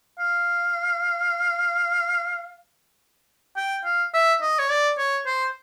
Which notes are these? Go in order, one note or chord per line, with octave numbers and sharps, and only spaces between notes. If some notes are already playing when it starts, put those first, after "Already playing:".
F5
G5
F5
E5
D#5
C#5
D5
C#5
C5